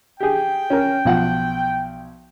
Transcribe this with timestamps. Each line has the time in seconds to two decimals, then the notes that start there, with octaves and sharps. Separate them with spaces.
0.20 G4 G#4 G5
0.70 C#4 A#4
1.05 B1 F3 F#5